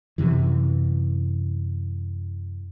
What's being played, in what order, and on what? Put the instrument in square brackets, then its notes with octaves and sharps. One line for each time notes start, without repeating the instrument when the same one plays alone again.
[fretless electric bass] F#2 C3 E3